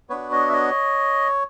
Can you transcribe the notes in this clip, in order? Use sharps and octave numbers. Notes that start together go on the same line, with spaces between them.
B3 D4 F#4 B4 C#5
C#5 D#5
E5
C#5 D#5